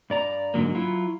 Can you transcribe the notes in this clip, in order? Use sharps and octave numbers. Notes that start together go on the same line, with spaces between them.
G2 D5 A#5
G#2 D3 F#3 A#3
F#3 E4 F4